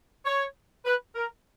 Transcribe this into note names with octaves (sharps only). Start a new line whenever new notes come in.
C#5
B4
A#4